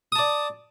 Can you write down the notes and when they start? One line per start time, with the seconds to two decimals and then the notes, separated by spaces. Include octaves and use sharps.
0.12 D#6
0.15 A5
0.19 D5